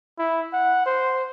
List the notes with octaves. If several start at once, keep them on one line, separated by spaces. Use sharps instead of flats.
E4
F#5
C5